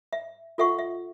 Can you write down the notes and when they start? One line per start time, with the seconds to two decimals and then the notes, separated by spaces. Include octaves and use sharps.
0.13 E5
0.58 F4 A4 E5 F#5 C#6
0.79 E5